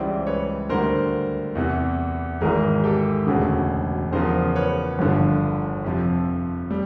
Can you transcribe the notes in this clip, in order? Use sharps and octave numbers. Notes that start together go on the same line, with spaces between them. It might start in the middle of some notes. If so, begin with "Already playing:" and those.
Already playing: C#2 C#3 E3 G3 C5 D5
B4 C#5
D2 D3 G3 A#4 C5
E2 C3 E3
G#1 G#2 E3 G#4 A#4
G4 A4
E1 D2 C#3 F#4 G#4
E2 C#3 F3 A#4 C5
B4 C#5
G1 G2 D3 F3
F2 C3 F3
G3